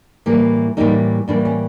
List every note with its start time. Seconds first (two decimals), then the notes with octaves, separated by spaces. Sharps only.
0.26 A2 E3 G3 A#3
0.77 A2 E3 G3 A#3 D#4
1.28 A2 E3 G3 A#3 D4
1.45 C#4